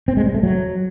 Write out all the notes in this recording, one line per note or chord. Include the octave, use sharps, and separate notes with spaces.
C4
G#3
G3
A3
F#3